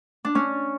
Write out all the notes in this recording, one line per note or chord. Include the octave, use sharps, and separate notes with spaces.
D4
C#4